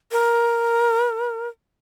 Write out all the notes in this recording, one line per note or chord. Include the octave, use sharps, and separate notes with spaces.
A#4